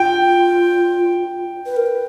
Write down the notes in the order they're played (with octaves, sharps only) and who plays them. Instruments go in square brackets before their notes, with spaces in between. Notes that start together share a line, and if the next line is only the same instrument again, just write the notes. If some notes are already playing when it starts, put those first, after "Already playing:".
Already playing: [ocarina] F4 [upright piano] G5
[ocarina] B4
A#4
B4